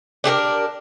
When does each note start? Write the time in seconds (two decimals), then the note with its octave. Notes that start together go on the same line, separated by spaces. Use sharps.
0.24 D4 G4 G#4 A#4